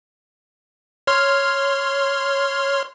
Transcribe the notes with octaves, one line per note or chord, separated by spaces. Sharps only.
C#5 C6 F6